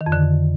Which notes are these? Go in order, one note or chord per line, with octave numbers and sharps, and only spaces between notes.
D#3
F2
D3